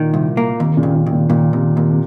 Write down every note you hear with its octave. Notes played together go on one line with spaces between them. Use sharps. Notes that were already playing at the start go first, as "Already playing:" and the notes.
Already playing: A#2 D#3
C2
A#3
D#2 C3
A#2 C#3
D#2
A#2 C#3
D#2
A#2
D#2 A#2
D#2 C3
D#2 C3
C3